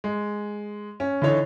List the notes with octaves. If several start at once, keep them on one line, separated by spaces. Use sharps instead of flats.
G#3
C#4
D3 E3 D#4 C#5